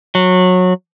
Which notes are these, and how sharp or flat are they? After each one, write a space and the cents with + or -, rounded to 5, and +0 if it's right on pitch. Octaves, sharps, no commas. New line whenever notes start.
F#3 -20